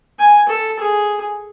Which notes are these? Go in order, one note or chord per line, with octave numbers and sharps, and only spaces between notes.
G#5
A4
G#4